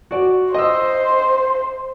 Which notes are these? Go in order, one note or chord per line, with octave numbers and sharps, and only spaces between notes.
F#4 D5
C5 D#5 D#6 E6